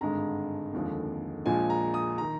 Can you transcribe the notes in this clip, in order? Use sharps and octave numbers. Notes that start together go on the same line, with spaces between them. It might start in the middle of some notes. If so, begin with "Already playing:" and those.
G#1 G2 D3 G#3 A#5
F1 D#2 D3 F3 G#3
A#1 A#2 F3 G#3 G#5
A#5
D#6
D#3 A#5